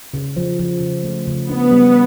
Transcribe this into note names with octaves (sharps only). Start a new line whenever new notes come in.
C#3
F3
F3
C#3
A3
C#3
B3 D4
G3